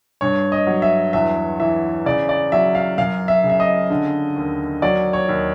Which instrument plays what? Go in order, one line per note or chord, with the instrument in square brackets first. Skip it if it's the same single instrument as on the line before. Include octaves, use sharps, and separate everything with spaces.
[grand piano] G2 C#5
D#5
F#3
E5
E2 E5
E3 E5
C#3 D5
D5
F#3 E5
F5
F#2 F5
E5
C#3
E5
D#5
D3
D#2
F#3 D5
C#5
D#2